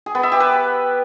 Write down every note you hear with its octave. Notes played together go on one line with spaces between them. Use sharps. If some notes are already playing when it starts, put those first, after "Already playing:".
G#4
B3
E5
G4
B4